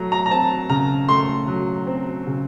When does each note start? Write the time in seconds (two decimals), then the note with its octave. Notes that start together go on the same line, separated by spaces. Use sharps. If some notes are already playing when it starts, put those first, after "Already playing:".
Already playing: F#3 A3 A#5
0.12 A#5
0.26 A#5
0.31 C4 A5
0.69 C#3 A#5
1.08 A3 C6
1.48 F#3
1.87 C4
2.27 C#3